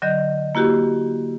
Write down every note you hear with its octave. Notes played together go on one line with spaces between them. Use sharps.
D3 F#3 D#5 G6
A#3 E4 F#4 G4